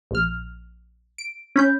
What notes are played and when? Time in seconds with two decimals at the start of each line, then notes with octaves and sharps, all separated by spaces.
0.11 A#1 F6
1.18 D7
1.56 C#4 B5 G6